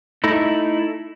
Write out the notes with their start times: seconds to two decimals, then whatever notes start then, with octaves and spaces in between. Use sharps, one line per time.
0.24 A3 D#4 E4